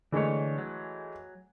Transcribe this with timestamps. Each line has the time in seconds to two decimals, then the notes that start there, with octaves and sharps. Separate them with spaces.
0.12 D3 E3 G#3 A3 C#5
0.58 F#3